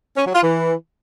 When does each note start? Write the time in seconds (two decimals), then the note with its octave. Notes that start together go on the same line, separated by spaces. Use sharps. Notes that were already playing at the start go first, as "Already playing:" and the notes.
0.16 C#4
0.25 F#3
0.34 F4
0.42 E3